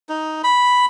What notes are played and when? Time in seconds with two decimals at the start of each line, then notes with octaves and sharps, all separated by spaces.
0.09 D#4
0.44 B5